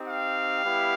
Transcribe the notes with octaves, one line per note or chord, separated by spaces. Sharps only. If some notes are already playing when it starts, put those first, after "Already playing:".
Already playing: C4 D#4 G4
F5
G3 B3 E4 G4